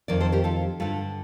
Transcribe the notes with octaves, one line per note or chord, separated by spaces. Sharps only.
F2 D#3 A#4 D5
A4 C5
G4 A#4
F4 A4
G2 D3 F4 A4